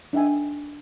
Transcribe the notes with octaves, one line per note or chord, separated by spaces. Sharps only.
D4 D#4 E5 G5 G#5